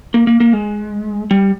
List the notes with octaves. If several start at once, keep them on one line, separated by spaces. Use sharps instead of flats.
A#3
A#3
A#3
G#3
G3